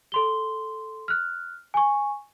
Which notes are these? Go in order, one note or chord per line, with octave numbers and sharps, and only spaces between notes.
A4 C6 G7
F6 F#6
G#5 C#6